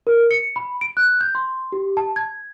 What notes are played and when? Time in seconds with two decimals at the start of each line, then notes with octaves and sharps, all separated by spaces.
0.07 A#4
0.31 C#7
0.56 B5
0.81 D7
0.97 F#6
1.21 G6
1.35 C6
1.72 G4
1.97 A5
2.16 G#6